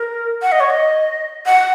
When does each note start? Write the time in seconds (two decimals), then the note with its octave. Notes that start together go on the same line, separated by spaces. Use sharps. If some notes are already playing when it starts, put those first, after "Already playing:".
Already playing: A#4
0.42 F#5
0.52 D#5
0.60 C#5
0.70 D#5
1.46 F#5